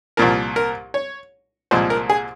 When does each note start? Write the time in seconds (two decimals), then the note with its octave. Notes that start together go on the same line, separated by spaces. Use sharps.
0.17 C2 A#2 F3 A#4
0.56 A#4
0.94 C#5
1.71 C2 A#2 F3 G#3 C5
1.90 A#4
2.10 G#4